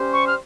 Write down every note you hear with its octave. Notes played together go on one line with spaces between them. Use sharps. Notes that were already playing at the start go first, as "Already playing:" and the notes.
Already playing: G3 C#4 G4 C5
C#6
F6